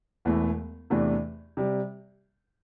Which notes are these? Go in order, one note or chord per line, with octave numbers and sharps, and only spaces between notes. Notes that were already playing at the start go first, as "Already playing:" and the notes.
E1 E2 E3 A3
E2 C3 E3 A3 D4
C3 G3